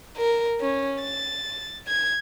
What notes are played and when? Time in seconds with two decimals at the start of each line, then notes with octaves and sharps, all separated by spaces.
0.17 A#4
0.60 C#4
1.01 A6
1.88 G#6